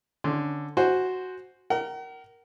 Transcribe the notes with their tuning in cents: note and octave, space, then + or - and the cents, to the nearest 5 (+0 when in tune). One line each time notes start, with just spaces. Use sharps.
D3 +0 C#4 -5 C6 +0
F#4 +0 C5 +0 G#5 +0
A#4 +0 F#5 +45